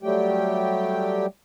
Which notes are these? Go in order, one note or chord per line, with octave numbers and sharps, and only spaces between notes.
F#3 G3 A3 G4 G5